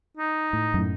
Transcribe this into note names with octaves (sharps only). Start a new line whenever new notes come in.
D#4
A2
F#2 A2